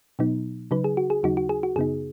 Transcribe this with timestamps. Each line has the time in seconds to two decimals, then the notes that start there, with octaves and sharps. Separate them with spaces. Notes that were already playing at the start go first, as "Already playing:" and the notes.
0.19 B2 F#3 B3 D#4
0.71 C#3 F#3 D#4 B4
0.84 G#4
0.97 F#4
1.10 G#4
1.23 D#2 C#3 F#3 D#4 F#4
1.37 F#4
1.49 G#4
1.63 F#4
1.76 F#2 C#3 B3 D#4 G#4